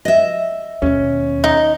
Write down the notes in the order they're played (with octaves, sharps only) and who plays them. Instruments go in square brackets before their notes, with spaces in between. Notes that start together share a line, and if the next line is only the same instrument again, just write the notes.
[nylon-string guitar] D#5 E5
[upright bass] D#2 B2 [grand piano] C#4
[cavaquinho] D#4